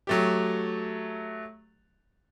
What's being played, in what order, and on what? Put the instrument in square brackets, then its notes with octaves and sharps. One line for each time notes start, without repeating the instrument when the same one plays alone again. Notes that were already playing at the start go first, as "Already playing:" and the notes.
[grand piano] F#3 A3 G4